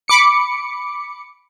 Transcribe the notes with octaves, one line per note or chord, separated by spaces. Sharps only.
B5 D6 C#7